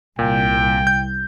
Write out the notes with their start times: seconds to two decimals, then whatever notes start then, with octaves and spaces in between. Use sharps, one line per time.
0.19 C2 A#2 G5
0.87 G6